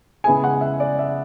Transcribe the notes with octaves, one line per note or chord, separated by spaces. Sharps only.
C#3 G#3 B3 E4 G#4 G#5
F#5
E5
D5
E5